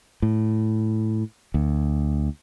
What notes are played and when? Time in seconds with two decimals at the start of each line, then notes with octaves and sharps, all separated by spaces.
0.22 A2
1.54 D2